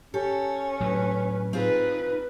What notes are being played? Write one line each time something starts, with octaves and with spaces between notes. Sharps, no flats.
C#4 G4 A4
A2 F#3 B4
C4 D#4 F4 G#4 B4